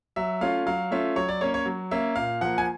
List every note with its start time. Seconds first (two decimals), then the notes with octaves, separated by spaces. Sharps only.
0.16 F#3 E5
0.41 A3 C#4 F4 F5
0.66 F#3 F5
0.91 A3 C#4 F4 E5
1.16 F#3 C#5
1.29 D5
1.41 A#3 C#4 C#5
1.54 C#5
1.66 F#3
1.91 A#3 C#4 E5
2.16 A#2 F5
2.41 F3 A#3 F#5
2.58 G#5